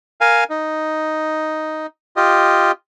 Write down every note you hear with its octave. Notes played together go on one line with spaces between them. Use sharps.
A#4 F5 G#5
D#4
F4 G4 D#5